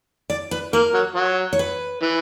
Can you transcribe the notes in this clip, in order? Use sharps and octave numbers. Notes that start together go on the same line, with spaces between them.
D5
B4
A#3 A#4
F#3
F#3
C#5
B4
E3